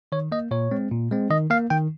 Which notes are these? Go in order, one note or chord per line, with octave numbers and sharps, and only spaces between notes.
D#3 C#5
A#3 D#5
A#2 C#5
G#3 C4
A#2
G#3 C4
D#3 D#5
A#3 F5
D#3 G5